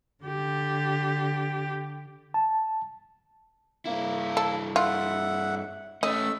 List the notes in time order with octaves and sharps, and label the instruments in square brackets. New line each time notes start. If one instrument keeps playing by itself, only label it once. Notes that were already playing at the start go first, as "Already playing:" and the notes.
[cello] D3 G4
[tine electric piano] A5
[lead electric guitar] G2 E4 [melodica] A#3
[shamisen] A4
[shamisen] F4 [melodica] E5 F#5
[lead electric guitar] A3 C#4 [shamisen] D#5 [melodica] E6